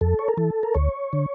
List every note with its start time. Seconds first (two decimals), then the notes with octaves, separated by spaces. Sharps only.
0.01 F2 A4
0.19 C#5
0.28 A#4
0.37 E3 A4
0.63 A#4
0.75 D2 C#5
1.13 D3